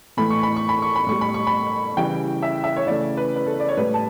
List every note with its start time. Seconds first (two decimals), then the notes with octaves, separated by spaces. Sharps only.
0.17 A2 E3 A3 B5
0.30 C#6
0.43 B5
0.56 C#6
0.69 B5
0.82 C#6
0.96 B5
1.07 A2 G3 C#6
1.21 B5
1.34 C#6
1.47 B5
1.97 C#3 E3 G3 G5
2.43 E5
2.64 E5
2.76 C#5
2.87 C#3 E3 A3 D5
3.17 B4
3.36 B4
3.46 A4
3.60 D5
3.69 C#5
3.77 A2 G3 B4
3.94 A5